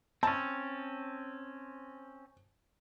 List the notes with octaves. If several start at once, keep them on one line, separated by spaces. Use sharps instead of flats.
C4 C#4 A5